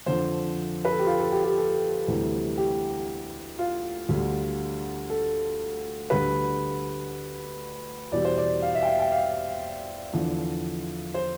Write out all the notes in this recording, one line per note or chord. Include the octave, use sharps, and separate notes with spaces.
F2 D3 F3 C5
B4
A4
G4
F4
A4
G4
G4
A4
D2 C3 E3 G3
G4
F4
D2 D3 G3
A4
D2 D3 G3 B4
E2 B2 G3 D5
C5
D5
F5
E5
G5
F5
G5
F5
E2 D3 F3
C5